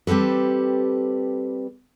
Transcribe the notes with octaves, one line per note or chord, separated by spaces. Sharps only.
G3 C4 G4 A4 B4